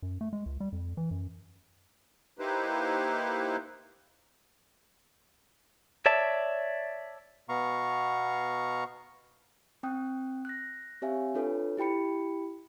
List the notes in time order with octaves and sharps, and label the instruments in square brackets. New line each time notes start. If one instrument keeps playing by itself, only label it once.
[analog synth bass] F#2
A3
G#3
C#2
G3
F2
E3
F#2
[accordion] A#3 D#4 E4 G4 B4 C5
[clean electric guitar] C#5 D5 E5 A5
[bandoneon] B2 B3 F5 A#5 C#6
[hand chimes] C4 G5 D#6 F#6
F#6 A#6
C4 G4 C#5 E5 F5 G#5
D4 F4 A4 B4 C#5
E4 G4 G5 B5 C#7